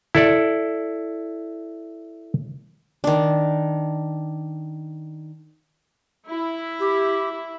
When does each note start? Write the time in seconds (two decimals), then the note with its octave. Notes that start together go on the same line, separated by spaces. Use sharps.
0.15 E4 A4 D5
3.04 D#3 D4
6.29 E4
6.80 G4